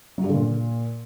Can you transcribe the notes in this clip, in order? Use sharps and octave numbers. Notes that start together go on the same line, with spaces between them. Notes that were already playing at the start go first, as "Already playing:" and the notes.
F#3
G2
D3
A#2